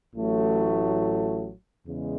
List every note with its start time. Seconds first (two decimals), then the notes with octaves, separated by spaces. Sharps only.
0.15 A1 A2 F#3 A3
1.86 E2 C#3 G#3